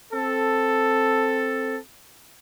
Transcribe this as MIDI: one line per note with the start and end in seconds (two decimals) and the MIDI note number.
0.13 1.78 60
0.13 1.78 69